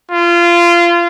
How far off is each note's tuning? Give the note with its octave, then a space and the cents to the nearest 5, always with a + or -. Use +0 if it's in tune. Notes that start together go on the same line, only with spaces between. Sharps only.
F4 -25